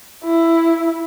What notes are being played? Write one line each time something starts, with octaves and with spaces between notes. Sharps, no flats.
E4